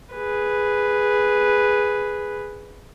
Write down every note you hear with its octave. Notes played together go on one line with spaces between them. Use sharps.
G#4 B4